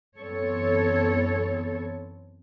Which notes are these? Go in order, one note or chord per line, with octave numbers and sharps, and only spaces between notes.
F#2 E3 B3 C4 A4 C#5